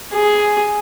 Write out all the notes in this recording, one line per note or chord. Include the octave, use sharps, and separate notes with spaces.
G#4